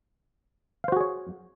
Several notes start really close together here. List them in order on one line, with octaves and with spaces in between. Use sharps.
F5 C5 F#4 G#4 C#5